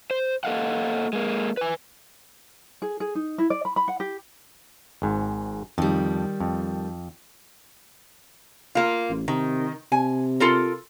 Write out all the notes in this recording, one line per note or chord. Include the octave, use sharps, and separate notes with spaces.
C5
A#3 A4 D#5 F5 F#5
G#3 A#3
B4 G#5
G#4
G#4
D#4
E4
D5
B5
B5
F#5
G4
G#1 G#2
F2 D#3 G3
F2
A#3 F4
A1
C3 D#3
C3 G#5
F4 A4 A#4